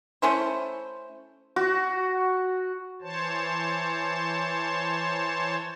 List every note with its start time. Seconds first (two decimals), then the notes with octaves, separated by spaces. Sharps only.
0.22 A3 C#4 E4 C5
1.56 F#4
3.01 E3 C5 C#5 A5